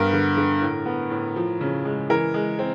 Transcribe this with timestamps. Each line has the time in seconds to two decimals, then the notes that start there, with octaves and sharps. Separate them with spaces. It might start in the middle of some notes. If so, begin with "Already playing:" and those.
Already playing: G2 B3 A#4
0.13 D3
0.37 D3
0.61 A2
0.85 B3
1.10 A2
1.36 F3
1.61 C#3
1.85 G#3
2.10 E3 A#4
2.34 G#3
2.59 C4